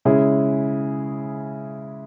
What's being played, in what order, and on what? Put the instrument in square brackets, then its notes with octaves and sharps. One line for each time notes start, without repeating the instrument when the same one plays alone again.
[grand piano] C#3 G#3 C#4 E4 G#4